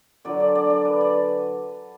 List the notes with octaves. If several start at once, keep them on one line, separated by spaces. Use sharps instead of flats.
D3 F#3 D5
D5
D5
D5
B4
D5